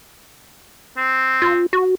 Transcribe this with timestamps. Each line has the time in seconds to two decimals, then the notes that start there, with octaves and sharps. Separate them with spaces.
0.97 C4
1.42 F4
1.73 F#4